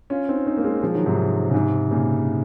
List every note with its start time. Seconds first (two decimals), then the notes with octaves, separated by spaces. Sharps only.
0.10 C#4 F4
0.29 C4 D#4
0.47 C4 D#4
0.57 A#3
0.64 G#3 C4
0.82 F3 G#3
0.95 D#3 F#3
1.06 G#2 C3
1.50 C#3
1.54 G#2 C3
1.91 A#2 C#3